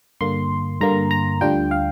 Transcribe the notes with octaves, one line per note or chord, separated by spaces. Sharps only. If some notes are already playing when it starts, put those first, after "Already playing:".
G2 D3 A#3 C6
G2 D3 A#3 A#5
A#5
D2 D3 G3 D4 F4 G5
F5